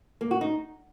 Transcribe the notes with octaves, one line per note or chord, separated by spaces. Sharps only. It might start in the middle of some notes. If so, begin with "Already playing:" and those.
A#3
F#4
D#4